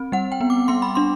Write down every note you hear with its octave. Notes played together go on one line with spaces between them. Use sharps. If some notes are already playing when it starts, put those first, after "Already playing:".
Already playing: C4
G3 F#5
G5
B3
D6
B3 C6
B5
D4 C6